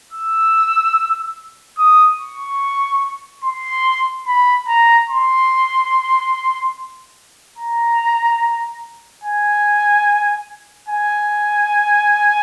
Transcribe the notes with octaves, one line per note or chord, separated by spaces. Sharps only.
E6
D#6
C#6
C6
B5
A#5
C6
A#5
G#5
G#5